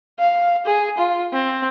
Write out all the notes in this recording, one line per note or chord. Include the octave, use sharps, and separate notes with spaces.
F5
G#4
F4
C4